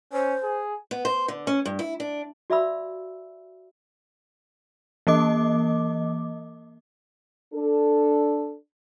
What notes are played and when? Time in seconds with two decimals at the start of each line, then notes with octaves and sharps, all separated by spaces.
0.13 C#4 C5
0.43 G#4
0.91 B3
1.05 C5
1.28 D3
1.47 C#4
1.66 G2
1.79 E4
2.00 D4
2.50 F#4 D5 E5 F5 B5 E6
5.07 E3 A#3 D#5 D6
7.54 D4 A4